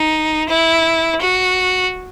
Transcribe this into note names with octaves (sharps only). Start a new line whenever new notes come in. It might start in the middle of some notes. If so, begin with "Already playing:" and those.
Already playing: D#4
E4
F#4